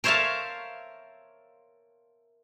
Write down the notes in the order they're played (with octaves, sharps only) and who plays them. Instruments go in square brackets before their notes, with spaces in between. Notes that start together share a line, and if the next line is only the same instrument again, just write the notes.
[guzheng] A#4 C5 C#5 E5 F5 A5